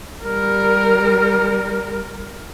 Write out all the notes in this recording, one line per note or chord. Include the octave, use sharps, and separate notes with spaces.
G3 A#4